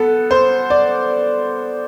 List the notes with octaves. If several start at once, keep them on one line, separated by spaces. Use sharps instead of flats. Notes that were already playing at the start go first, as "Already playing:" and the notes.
Already playing: B3 A4
C5
D5